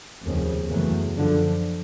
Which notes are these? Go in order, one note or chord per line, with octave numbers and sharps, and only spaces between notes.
F1 D#2 C#3 F3
F#1 E2 C#3 F#3 A3
F#2 D3 F3